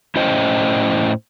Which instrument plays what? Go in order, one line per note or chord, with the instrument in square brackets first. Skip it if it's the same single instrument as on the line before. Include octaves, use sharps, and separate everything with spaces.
[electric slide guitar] A2 C#4 E4 C5 D#5 G5